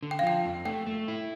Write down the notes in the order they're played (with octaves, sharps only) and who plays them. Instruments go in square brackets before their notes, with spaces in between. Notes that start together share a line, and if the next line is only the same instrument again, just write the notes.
[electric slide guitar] D3
[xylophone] G5
F5
[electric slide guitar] F3 [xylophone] G5
[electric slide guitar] F2
[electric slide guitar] A3 [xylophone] G5
[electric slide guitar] A3
E4